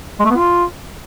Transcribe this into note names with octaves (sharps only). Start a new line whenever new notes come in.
G#3
A3
B3
F4